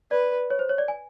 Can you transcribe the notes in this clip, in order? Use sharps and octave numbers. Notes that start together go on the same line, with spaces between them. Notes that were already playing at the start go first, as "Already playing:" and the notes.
B4 D5
C#5
C5
C#5
D5
G#5